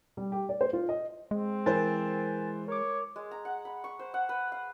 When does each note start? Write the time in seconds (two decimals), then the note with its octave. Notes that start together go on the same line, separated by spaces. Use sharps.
0.17 G3
0.32 G4
0.49 D5
0.61 C5
0.73 F4
0.89 D#5
1.31 G#3 C4
1.66 E3 A#4 C5 G#5 A6
2.68 A#4 C#5 D6
3.16 G#3
3.31 A#5
3.45 F#5
3.65 B5
3.84 C#6
3.99 C5
4.14 F#5
4.29 B4
4.52 F5